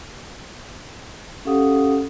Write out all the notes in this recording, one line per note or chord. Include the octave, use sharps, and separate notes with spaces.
C#4 G4 A4 F5 F#5 D#6